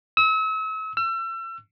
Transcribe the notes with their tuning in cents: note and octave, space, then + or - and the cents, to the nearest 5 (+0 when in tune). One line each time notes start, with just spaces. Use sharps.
E6 -40
E6 +35